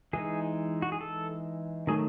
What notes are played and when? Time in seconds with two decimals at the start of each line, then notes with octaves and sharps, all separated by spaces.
0.13 E3 G#3 D#4 G#4
0.82 F#4
0.92 G#4
1.01 A4
1.87 D#3 F#3 A3 G#4